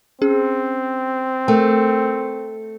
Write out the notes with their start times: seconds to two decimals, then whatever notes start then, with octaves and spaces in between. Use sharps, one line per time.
0.22 C4 C#4 G#4
1.48 A3 A#4 G5